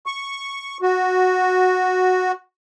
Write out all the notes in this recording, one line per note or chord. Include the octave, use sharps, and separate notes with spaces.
C#6
F#4